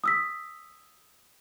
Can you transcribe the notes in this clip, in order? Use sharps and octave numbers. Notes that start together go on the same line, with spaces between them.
D#6 E6 B6